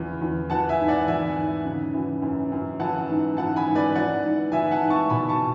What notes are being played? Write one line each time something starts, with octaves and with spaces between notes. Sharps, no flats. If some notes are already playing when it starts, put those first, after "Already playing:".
Already playing: E2 C#3 E3
E2
E3 F#5 A5
E5 G#5
G#2
D5 F#5
E3 E5 G#5
G#2
C#3
E3
F#2
F#2
E3 F#5 A5
G#2
E3 F#5 A5
G#5 B5
G#2
B4 D5
E3 D5 F#5
G#2
E3 E5 G#5
F#5 A5
G#2
A5 C#6
B2 G#5 B5
A5 C#6